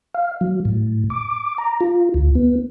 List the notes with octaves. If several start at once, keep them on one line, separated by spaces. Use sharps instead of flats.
F5
F#3
A2
D6
A#5
F4
D2
B3